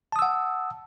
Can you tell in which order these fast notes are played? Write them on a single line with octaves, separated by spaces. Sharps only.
A5 D#6 E6 F#5